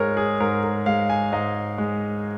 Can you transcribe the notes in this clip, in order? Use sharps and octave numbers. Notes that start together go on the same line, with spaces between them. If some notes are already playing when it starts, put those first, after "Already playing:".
Already playing: G#2 G#3 A#4 C#5
G#4
G#2 A#4
A#4
G#3 F5
G#5
G#2 D#5
G#3